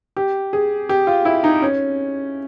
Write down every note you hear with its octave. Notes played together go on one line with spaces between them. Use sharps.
G4
G#4
G4
F4
E4
D#4
C#4